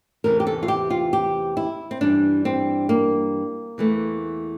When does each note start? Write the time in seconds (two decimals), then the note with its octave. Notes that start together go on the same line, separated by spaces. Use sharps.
0.24 E2 C3 E3 A3 A#4
0.40 G4
0.47 A4
0.63 F4
0.68 G4
0.90 F4
1.13 G4
1.57 E4
1.91 C4
2.01 G2 E3 G3 D4
2.45 C4
2.89 A#3
3.78 E2 E3 A3